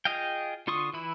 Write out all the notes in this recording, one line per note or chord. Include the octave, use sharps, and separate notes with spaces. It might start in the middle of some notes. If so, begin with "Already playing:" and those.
F4 G#4 D#5 F5 G5
D3 F4 C6 C#6 D#6
E3 E4 B5